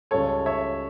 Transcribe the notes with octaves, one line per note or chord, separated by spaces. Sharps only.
C#2 C#3 G3 A4 C#5
C#5 E5